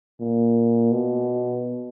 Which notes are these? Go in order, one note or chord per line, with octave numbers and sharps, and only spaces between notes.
A#2
B2